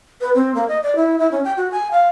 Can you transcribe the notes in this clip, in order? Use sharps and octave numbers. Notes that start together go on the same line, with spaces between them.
B4
C4
A#3
D#5
D5
E4
E4
C#4
G5
F#4
G#5
F5